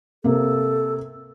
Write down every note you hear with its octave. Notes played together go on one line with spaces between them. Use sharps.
C3 A#3 A4